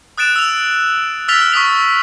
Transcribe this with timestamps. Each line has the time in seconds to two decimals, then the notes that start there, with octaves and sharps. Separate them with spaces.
0.18 D#6 F#6 A6 D7 E7
0.36 E6 F7
1.28 E6 F6 A6 B6 F7 G7
1.52 C#6 D#6 B6 F7